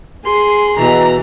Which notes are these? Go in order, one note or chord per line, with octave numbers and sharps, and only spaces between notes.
G#4 C6
B2 E3 A#5